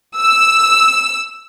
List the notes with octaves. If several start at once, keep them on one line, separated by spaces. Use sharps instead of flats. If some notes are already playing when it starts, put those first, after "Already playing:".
E6